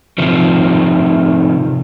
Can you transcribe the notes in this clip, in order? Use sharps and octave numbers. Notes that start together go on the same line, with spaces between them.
C3 D#3 F3